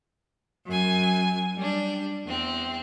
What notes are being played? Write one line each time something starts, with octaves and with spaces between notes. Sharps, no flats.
F#2 G#5
G3 D4
E2 C4